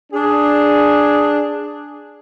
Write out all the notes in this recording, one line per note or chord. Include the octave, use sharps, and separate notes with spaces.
D4 G#4